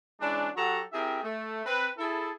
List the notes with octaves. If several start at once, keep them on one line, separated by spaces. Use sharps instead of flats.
E3 G#3 C#4 D4
F#3 F#4 G4 A4 F#5 A#5
C4 E4 G4 G#4 A#4 E5
A3
C4 B4
E4 G#4 A4